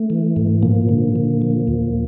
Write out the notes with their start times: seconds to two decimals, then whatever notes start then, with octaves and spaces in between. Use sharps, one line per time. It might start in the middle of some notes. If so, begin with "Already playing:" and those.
Already playing: A3
0.10 E3
0.36 G#2
0.63 A#2 F3 A#3
0.89 D3
1.15 D3
1.42 F3
1.68 D#2